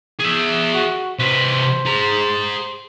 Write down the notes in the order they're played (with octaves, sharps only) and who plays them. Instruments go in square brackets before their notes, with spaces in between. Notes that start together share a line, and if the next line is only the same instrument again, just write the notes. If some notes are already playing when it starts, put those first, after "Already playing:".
[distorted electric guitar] G#4 E5
[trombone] F#4
[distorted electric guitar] C3 B4 [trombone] C5
[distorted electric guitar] G#4 A#5